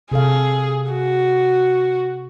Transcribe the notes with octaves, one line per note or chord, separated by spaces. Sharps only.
C3 G#4 A4 F5
F#4